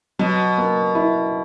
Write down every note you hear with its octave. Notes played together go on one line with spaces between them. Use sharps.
B2 F#3
A#3
E4